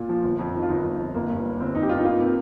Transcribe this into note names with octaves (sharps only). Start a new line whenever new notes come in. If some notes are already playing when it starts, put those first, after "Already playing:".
Already playing: A#2 F4
F3
G1
F2
D#3
F4
G1 D#4
G1
F2
G1 A#3
G2
G3
G1 C4
G1 D#4
G4
G2 F4
D#4
A#3 F4
C3